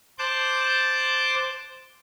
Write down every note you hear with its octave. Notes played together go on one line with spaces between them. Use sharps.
C5 A5 D6 F#6 G6